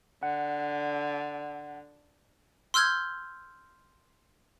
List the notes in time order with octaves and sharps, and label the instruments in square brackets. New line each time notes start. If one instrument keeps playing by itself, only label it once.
[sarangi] D3 [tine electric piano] F#5
[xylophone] C6 E6 F6 G6 G#6